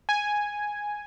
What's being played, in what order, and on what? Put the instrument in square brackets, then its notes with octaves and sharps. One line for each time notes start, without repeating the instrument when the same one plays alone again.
[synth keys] G#5